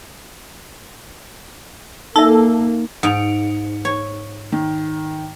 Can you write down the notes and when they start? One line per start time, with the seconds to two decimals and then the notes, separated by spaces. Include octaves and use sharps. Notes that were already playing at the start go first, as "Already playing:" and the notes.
2.16 A#3 D#4 A4 E5
3.03 G#2 C#7 D7 F7
3.85 C#5
4.52 D#3